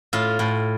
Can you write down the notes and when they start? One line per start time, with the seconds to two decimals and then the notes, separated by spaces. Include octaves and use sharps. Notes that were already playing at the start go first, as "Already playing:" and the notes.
0.13 A2 F4
0.39 A2